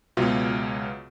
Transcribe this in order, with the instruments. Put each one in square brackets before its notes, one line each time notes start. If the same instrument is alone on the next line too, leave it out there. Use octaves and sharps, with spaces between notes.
[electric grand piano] C#2 B2 F#3 F4 E5